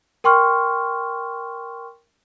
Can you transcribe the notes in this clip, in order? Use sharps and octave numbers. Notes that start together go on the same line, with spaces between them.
A#4 G5 C6 C#6 F6